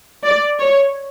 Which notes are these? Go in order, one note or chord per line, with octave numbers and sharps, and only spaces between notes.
D5
C#5